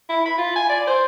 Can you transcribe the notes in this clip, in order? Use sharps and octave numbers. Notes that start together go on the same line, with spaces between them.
E4
B5
F4
G#5
D5
C5